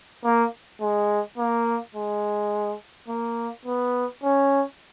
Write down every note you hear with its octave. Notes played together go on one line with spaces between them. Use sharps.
A#3
G#3
A#3
G#3
A#3
B3
C#4